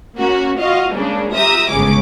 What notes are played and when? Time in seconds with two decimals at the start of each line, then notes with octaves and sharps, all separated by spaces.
0.17 A#3 C#4 F#4
0.58 F4 F#4 D#5 F5
0.93 C#3 G#3 A#3 D4
1.32 F4 G4 E5 A#5 D#6
1.70 G1 C#2 C#3 G#3 C#4 D6